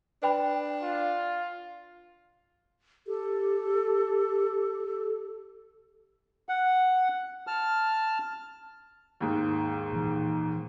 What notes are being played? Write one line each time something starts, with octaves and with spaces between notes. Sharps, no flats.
D4 B4 G5 B5
F4
G4 A4
F#5
A5 F6
D#2 G#2
A#2 E3